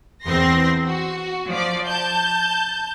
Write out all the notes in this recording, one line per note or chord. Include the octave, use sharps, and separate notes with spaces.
E2 C4 C6 A#6
F#4
F3 D5
A5 G6